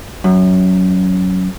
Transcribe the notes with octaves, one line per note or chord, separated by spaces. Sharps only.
F#2